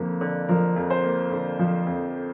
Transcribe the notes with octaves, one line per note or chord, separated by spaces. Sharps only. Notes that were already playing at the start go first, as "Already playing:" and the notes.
Already playing: F2 D3 F3 A#3
D3
F3 A#4
F2
C5
A#3
D3
F3
F2